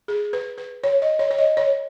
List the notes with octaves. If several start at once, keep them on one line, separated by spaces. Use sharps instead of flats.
G#4
B4
B4
C#5
D#5
C#5
C#5
D#5
C#5